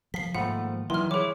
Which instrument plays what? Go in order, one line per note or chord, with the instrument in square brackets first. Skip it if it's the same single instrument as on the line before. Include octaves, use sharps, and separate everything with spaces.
[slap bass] F3 [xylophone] B6 C7
[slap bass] G#2 D#3 A#3 [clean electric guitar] F3 A3 [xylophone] F#5 B5
[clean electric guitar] D#3 [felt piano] E3 [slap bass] F#3 G3 [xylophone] C6 F6
[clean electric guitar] E3 E4 [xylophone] G#4 D6 [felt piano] C#5